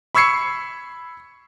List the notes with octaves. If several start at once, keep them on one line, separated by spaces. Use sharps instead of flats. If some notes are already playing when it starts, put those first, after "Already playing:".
B5 C#6 E6 G#6 C7 C#7